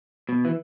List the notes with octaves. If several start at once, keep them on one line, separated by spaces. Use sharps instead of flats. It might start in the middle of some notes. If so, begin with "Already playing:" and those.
B2
E3